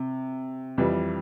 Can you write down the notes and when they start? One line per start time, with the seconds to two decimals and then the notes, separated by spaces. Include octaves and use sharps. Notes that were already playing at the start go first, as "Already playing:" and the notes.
Already playing: C3
0.78 F2 E3 G3